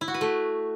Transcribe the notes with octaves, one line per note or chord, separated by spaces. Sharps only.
E4
F#4
B4
A3